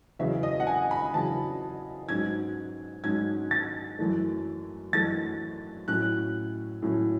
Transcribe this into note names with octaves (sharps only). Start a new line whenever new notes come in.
E2 C#3 F#3 E5
D#5
F#5
G#5
B5
E2 C#3 F#3 A5
G#2 F#3 C#4 G#6
G#2 F#3 C#4 G#6
A6
F#2 E3 A3
F#2 E3 A3 A6
A2 F#3 C#4 F#6
A2 F#3 C#4